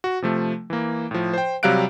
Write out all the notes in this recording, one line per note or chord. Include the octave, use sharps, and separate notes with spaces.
F#4
C3 F3 A3
E3 A#3
A2 F3
C5 G5
C3 F#3 G3 F5 F#6 D7